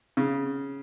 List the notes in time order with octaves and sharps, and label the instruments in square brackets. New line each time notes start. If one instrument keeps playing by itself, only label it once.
[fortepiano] C#3